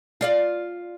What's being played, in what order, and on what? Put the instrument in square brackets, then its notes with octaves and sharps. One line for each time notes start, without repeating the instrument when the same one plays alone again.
[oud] F4 D5 F5